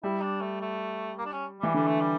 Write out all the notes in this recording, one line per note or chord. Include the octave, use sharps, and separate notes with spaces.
G3 E4
D4
A3
A3
A#3
D4
C#4
E3 G3
D3 G3
A3
G3